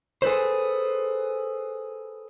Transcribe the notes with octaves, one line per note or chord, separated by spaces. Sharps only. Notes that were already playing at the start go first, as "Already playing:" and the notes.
G#4 A4 B4 C5